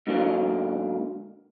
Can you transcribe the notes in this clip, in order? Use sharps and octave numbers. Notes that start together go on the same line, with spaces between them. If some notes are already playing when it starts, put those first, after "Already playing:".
G#2 B2 D3 F#3 A#3